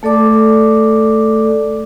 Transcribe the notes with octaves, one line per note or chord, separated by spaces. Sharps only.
A3 A4 D5 D6